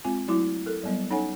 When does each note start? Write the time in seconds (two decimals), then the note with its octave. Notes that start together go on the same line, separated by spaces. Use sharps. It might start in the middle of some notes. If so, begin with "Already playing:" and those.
0.04 G#3 C4 F4 G#5
0.28 F#3 A3 E4 F#4 D6
0.66 A4 A#4
0.83 F#3 G3 B3 D#5
1.10 C#4 D#4 A4 C#5 F#5 G#5